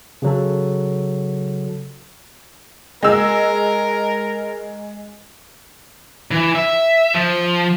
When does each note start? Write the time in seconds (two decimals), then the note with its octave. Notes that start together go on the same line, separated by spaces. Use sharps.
0.22 C#3 F#3 A4
3.03 G#3 A#4 E6
6.31 E3
6.55 E5
7.14 F3